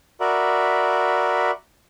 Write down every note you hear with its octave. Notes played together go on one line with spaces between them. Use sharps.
F#4 A#4 D5 E5 B5